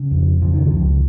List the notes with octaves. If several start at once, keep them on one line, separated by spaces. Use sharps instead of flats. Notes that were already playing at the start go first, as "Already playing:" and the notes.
Already playing: C#3
F2
C#3 F3
D#3
F3
C#2